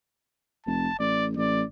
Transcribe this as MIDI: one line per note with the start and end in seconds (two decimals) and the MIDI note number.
0.66 0.88 29
0.66 0.98 81
0.99 1.34 33
0.99 1.26 74
1.37 1.63 33
1.37 1.64 74